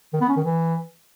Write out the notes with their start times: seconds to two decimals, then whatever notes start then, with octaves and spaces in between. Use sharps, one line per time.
0.13 D#3
0.21 B3
0.29 C#4
0.36 D#3
0.44 E3